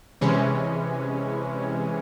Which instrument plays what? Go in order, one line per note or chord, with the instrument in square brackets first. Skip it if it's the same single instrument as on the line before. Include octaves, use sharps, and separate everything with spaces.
[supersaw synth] C3 E3 G#3 C#4